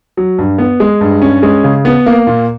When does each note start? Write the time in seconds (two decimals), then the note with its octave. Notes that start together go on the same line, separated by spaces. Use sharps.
0.17 F#3
0.39 G2
0.58 B3
0.80 G#3
1.01 G2
1.22 C#4
1.43 G#3
1.64 C#3
1.85 B3
2.06 A#3
2.27 A#2